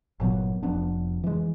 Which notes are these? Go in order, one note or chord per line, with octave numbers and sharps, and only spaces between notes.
G1 A#2 F#3 B3
F1 F2 B3 D4
E3 G#3